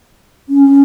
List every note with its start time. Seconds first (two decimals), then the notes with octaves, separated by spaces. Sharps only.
0.49 C#4